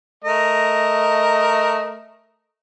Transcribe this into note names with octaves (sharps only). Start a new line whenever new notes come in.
A3 A#4 D#5